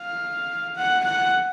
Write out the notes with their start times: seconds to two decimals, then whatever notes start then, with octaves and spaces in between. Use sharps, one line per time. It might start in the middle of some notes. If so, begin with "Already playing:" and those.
Already playing: F5
0.75 F#5
1.04 F#5